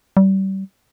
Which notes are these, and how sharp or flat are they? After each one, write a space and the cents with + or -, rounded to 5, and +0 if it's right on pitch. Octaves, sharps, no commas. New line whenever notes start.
G3 -30